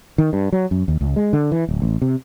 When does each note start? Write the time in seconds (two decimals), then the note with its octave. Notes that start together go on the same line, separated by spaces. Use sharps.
0.18 D#3
0.33 G2
0.53 F#3
0.71 F#2
0.88 D#2
1.01 C#2
1.16 G#3
1.33 D3
1.52 E3
1.69 D1
1.82 A1
2.02 C3